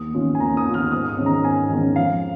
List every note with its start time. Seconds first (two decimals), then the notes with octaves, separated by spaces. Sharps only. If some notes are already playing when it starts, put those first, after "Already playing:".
Already playing: D#2 D#6
0.14 D#3 C#4 F4
0.35 G#5
0.40 D#2 A#5
0.57 D#6
0.65 D#3 C#4 F4
0.74 F6
0.92 G#2 D#6
1.09 D#6
1.18 D#3 G#3 C#4
1.26 A#5
1.44 G#2 G#5
1.70 D#3 G#3 C#4
1.96 F2 F5